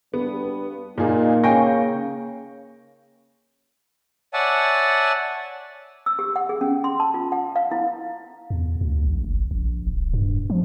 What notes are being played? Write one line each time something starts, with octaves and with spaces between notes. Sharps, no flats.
G2 B3
A#2 A#3 D#4 G#4
C#3 F5 G5 G#5 C#6 G6 A#6
C#5 D5 E5 F#5 G#5 A5
E6
G4
F#5
G#4
C#4
C6
A5
F4
F#5
F5
E4
E2
D2
A#1
F#1
A#1
D1
G2
F3